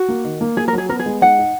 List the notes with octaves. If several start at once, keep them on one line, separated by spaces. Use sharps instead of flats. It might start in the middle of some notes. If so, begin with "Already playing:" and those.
Already playing: F#4
A#3
D#3
A#3
A#3 G#4
A#4
F#3
G#4
B3 A#4
G#4
G#3
D#4 F#5
D#4